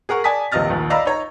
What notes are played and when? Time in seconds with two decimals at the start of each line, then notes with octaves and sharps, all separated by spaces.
0.09 G#4 A#4 F#5 C#6
0.24 D5 G#5 A5 D#6 B6
0.52 D#1 A#1 C3 D#5 F6 A6
0.70 A#1 D#2
0.90 D5 D#5 F5 A#5 B5 E6
1.05 D#4 C#5 A#5